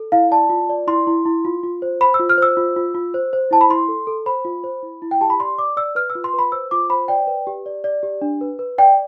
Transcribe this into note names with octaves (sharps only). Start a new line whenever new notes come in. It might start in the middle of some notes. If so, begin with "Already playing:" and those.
Already playing: A4
E4 F5
D5 A5
F4
D5
E4 C6
E4
E4
F4
F4
C5
C5 B5
E6
F4
F6
C5 E6
F4
F4
F4
C5
C5
E4 A5
B5
E4 C6
A4
A4
C5 B5
F4
C5
E4
E4
G5
G4 A5
B5
D5 C6
D5 D6
D5 E6
B4 F6
E6
F4
C6
B4
B5
C5 E6
F4 D6
C5 B5
D5 G5
B4
G4
D5
D5
G4
D4
B4
B4
D5 G5